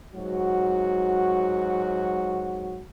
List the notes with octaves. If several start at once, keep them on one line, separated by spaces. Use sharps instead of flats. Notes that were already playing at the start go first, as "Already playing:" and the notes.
G#2 F#3 F#4